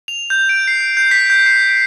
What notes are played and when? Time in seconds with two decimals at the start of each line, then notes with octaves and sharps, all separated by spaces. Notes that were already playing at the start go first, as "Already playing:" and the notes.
0.08 F7
0.30 G6
0.49 D7
0.67 C7
0.80 G6
0.97 G6
1.11 B6
1.30 G6
1.46 C7
1.69 D7